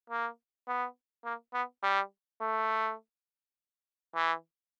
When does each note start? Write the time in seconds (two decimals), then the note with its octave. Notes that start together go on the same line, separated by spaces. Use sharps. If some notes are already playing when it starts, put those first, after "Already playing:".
0.10 A#3
0.68 B3
1.25 A#3
1.54 B3
1.83 G3
2.41 A3
4.15 E3